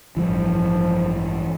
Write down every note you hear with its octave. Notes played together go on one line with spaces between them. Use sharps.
A1 G2 E3 F3